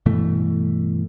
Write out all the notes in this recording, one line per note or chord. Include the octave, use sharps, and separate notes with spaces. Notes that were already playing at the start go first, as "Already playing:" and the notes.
G2 B2 E3 A3